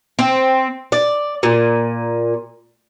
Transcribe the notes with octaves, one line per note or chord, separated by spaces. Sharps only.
C4
D5
A#2